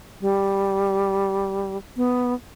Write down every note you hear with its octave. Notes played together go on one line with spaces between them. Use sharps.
G3
B3